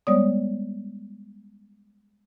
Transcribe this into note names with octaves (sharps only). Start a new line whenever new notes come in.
G3 G#3 B3 C#5 D5 D#6